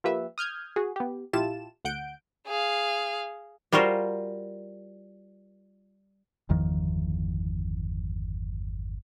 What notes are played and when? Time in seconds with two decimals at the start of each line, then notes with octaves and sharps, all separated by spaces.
0.04 F3 A#3 G4 B4 E5
0.38 D#6 F6 G6 G#6
0.76 F#4 G#4
0.96 B3 G4
1.33 A#1 E4 F4 G4 A5 E7
1.85 D2 F#5 G6 D7
2.47 G#4 F5
3.72 G3 F4 F#4 A#4 C5
6.49 G1 E2 D#3 F3